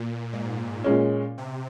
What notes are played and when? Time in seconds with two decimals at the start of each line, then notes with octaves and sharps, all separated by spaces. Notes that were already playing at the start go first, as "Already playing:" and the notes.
Already playing: A#2
0.33 G#2
0.84 A#2 G#3 C#4
1.38 C3